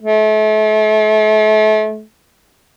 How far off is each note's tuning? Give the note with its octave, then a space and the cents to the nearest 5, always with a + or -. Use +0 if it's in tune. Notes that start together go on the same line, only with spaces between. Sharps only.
A3 -35